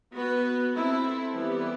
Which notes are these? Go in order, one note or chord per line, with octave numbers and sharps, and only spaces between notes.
B3 F#4 B4
C4 E4 A4
E3 G3 B3 E4 G4